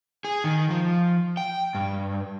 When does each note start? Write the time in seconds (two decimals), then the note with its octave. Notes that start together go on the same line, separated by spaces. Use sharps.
0.25 G#4
0.44 D#3
0.70 F3
1.37 G5
1.75 G2